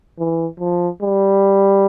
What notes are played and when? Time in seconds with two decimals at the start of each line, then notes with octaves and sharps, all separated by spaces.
0.18 E3
0.59 F3
1.02 G3